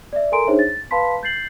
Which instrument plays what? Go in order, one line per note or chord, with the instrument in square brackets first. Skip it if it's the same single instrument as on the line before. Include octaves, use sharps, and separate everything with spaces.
[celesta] D5 E5
A4 A#4 G#5 A#5 C6 D7
D4 D#4 G#4 C5 C#5 E5
A6
B4 F5 A5 B5 C6 B6
G6 A6 C7 F#7